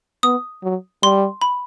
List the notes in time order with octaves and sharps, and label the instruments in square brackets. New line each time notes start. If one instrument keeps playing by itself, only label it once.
[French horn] B3 [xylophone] D#6
[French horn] F#3
[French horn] G3 [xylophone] C6
[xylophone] B5